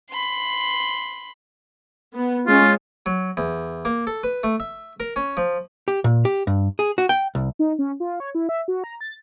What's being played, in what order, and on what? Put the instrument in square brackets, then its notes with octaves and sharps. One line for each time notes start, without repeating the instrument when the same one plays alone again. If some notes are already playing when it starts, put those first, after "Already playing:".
[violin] B5 C6
[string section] B3
[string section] G#3 C#4 [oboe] F4
[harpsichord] F#3
E2
A#3
A4
B4
A3
E5
A#4
C#4
F3
[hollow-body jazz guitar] G4
A#2
G4
G2
G#4
F#4
G5
C2
[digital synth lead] D#4
C#4
F4
C#5
E4
E5
F#4
A#5
A6